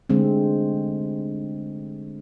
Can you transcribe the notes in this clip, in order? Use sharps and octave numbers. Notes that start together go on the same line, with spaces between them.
D3 G#3 A3 C4